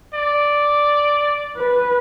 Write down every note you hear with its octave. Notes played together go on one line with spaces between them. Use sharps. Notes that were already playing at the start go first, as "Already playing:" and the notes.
D5
B4